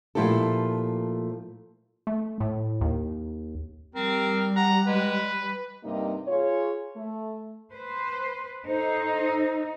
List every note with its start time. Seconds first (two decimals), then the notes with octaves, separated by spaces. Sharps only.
0.15 A#2 F3 A3 E4 G4 A4
2.07 A3
2.40 A2
2.81 D#2
3.95 G3 C4 A#4
4.56 F#5 A#5
4.87 G#3 B4
5.83 G2 C3 G3 A#3 D#4
6.28 F4 G#4 C#5
6.95 A3
7.73 B4 C5
8.66 D#4 A4 C5